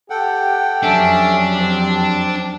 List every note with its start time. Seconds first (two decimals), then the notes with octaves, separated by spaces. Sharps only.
0.10 G4 A4 F#5 G5
0.83 F2 F#3 C#4 D4 A4 E5
1.58 C4